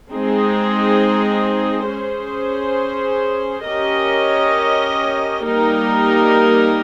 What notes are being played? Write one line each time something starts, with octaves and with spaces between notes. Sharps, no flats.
G#3 C4 D#4 G#4
C#4 G#4 C5
C#4 G4 A#4 D#5
G3 A#3 D#4 G4 A#4